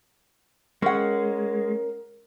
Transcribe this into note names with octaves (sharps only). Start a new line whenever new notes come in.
G#3 C#4 A#4 F#5